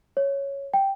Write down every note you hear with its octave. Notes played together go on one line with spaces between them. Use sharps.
C#5
G5